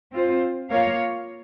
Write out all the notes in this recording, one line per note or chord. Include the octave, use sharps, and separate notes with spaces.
C4 F4 C5
A#3 F4 A#4 C#5 F5